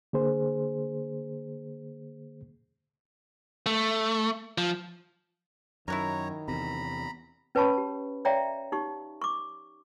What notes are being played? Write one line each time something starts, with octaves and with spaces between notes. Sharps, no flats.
D3 A#3 G#4 C5
A3
F3
F#2 D#3 E4 F#4 A#4 C#5 A#5
E2 C3 A#5 B5
C#4 B4 C#5 A5 B5 C#6
G4
C#5 D5 E5 F5 G5 A#5
D#4 G4 C#6
C#6 D6